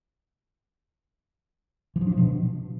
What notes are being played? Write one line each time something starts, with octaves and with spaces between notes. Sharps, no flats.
E3
F3
D4
F3
B2